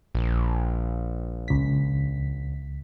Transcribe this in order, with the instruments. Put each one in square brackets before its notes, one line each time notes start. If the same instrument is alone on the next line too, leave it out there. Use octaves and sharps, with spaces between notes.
[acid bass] A#1
[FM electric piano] C#2 B6